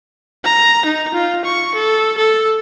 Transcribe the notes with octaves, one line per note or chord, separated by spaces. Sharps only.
A#5
D#4
F4
C#6
A4
A4